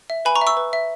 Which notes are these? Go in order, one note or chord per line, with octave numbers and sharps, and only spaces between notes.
E5
B4 G#5 B5
A#5 C#6
E5
C#6 E6
B4
E5